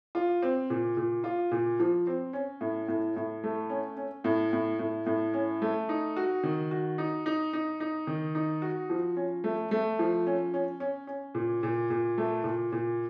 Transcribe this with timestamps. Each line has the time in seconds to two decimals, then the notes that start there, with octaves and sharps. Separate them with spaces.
0.15 F4
0.42 C4
0.70 A#2
0.97 A#2
1.24 F4
1.51 A#2
1.80 F3
2.07 C4
2.33 C#4
2.61 A2
2.88 A2
3.16 A2
3.44 A3
3.70 C#4
3.97 C#4
4.24 A2
4.53 A2
4.79 A2
5.06 A2
5.34 C#4
5.62 A3
5.89 D#4
6.16 F#4
6.43 D#3
6.71 F#4
6.98 D#4
7.26 D#4
7.53 D#4
7.80 D#4
8.07 D#3
8.35 D#4
8.62 F#4
8.90 F3
9.16 C#4
9.44 A3
9.71 A3
9.99 F3
10.27 C#4
10.54 C#4
10.80 C#4
11.07 C#4
11.35 A#2
11.63 A#2
11.90 A#2
12.18 A3
12.44 A#2
12.72 A#2